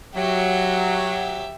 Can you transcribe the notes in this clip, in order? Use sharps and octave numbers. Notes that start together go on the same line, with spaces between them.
F#3 G4 E5